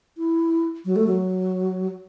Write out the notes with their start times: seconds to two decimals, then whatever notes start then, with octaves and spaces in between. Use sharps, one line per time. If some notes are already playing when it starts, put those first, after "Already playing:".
0.17 E4
0.85 F#3
0.96 A3
1.07 F#3